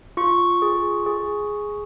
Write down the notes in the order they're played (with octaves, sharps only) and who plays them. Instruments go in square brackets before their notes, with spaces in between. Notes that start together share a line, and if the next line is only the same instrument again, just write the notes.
[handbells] F4 C#6
G#4
G#4